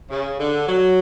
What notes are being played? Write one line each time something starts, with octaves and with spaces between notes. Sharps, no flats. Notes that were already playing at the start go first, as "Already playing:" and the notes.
C#3
D3
F#3